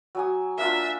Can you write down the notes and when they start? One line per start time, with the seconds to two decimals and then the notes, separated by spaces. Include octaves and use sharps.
0.15 F#3 G#5 D#6
0.58 A#3 D4 F4 E5